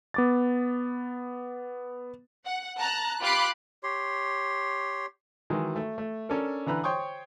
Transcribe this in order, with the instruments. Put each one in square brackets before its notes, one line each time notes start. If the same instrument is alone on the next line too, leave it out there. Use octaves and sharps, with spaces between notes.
[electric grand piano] B3 D6 A6
[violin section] F#5
A5 A#5 F#6
F4 G4 B5 D6 F#6 C7
[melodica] G4 C#5 C6
[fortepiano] D#3 E3 F#3 G#3
A3
A3
C#4 D4 A4 A#4
D3 E3 A#5 B5 F#6
C5 C#5 G5 C6 C#6 D#6